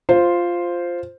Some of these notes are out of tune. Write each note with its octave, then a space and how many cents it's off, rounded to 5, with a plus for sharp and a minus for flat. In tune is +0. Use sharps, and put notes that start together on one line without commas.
F4 +0 C5 +0